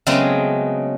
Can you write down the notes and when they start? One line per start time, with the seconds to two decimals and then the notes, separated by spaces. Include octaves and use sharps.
0.07 C#3 F#3 G#3 A3 B3 C4